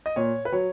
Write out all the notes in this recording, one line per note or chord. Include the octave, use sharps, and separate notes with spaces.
D#5
A#2 C#5
B4
F#3 C#5